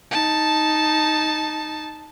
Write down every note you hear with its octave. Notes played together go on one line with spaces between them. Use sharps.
D#4 A5